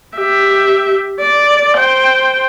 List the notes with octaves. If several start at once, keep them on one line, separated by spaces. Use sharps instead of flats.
G4 E5
D5
C5 G5